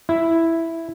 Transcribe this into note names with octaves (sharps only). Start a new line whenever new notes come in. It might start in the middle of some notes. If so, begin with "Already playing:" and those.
E4